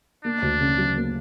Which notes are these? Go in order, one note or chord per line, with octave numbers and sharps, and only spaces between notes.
A#3 D4
D2
C#3
F#3
A#3